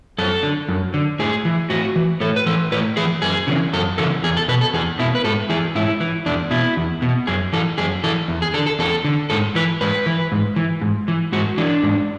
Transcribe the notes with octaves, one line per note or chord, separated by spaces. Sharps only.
F#2 A4
D3
F#2
D3
A2 G#4
E3
A2 F#4
E3
A2 A4
B4
E3 A4
A2 B4
E3 G#4
F#2 G#4
C#3 E3
F#2 A4
C#3 E3 A4
E2 G#4
A4
B2 B4
A4
E2 G#4
B2 E4
B4
G#2 A4
E3 G#4
G#2 E4
E3
E2 D4
B2 E4
E2
B2
F#2 G#4
E3 A4
F#2 G#4
E3 A4
E2
G#4
D3 A4
A4
E2 A4
D3
G#2 A4
E3 B4
G#2 B4
E3
G#2
E3
G#2
E3
G#2 F#4
E3 D4
G#2